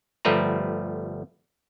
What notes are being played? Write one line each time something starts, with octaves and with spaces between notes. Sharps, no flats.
G1 F3 G3 A3 B4 A#5